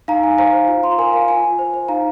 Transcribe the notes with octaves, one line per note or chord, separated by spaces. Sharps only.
D#4 F5 A#5
D#4 G#5
C5 F5 A#5
C5
F4
F4 C6
A#5
A#4 G#5
A#4 F5
F4 G#5
F4
C5
C5
D#4 F5 A#5